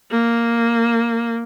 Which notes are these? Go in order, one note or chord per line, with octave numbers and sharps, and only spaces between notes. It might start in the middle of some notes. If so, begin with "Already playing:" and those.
A#3